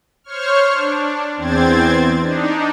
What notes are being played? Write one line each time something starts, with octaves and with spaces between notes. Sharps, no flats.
C5 C#5 C#6 F6
D4
E2 C4 C5 G#6 A6
D4 D#4